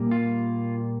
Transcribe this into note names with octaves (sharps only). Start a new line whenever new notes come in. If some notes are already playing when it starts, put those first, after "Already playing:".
Already playing: A#2 G3 A#3
F4